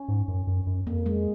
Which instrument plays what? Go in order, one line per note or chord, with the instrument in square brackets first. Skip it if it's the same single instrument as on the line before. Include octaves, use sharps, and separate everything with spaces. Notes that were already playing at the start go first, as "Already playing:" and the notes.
Already playing: [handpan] C#4
[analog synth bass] G#2
F#2
F#2
F#2
[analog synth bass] F2 [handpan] A#3
[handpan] G#3